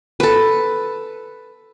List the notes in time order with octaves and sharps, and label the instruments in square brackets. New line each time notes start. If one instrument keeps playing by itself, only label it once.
[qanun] A4 B4